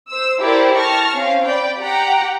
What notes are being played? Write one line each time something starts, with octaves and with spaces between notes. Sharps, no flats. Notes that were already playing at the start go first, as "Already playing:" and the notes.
C5 E6
E4 G4 A4 A#4 C5 D5
A5 C#6 F6 A#6
C4 C#4 F5
D5 G5 B5
G4 F#5 G5 A#5